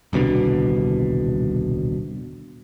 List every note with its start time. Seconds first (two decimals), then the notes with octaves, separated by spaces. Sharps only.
0.13 D#1 C2 B2 D3